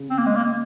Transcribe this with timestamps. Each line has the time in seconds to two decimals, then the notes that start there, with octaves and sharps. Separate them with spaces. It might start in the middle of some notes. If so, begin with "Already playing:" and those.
Already playing: C#3
0.10 C4
0.18 A#3
0.26 G#3
0.36 A#3